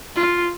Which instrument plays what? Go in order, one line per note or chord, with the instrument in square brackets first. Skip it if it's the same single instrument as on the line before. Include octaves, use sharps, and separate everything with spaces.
[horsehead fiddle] F4